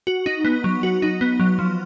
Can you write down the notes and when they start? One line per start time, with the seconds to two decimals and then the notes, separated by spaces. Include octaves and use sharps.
0.07 F#4
0.26 D#4
0.44 B3
0.64 F#3
0.83 F#4
1.02 D#4
1.21 B3
1.40 F#3
1.59 F3